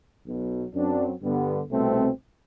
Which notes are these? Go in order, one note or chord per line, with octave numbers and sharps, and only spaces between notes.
B1 B2 F#3
F#2 F#3 C4 D4
G2 D3 G3 B3
C2 B2 A3 C4